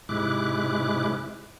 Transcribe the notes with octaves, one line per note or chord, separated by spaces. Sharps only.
G#2 C3 G#3 E4 D6 F#6